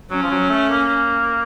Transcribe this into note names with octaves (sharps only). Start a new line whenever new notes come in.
F#3 C#4
F3
F#3
A3
A#3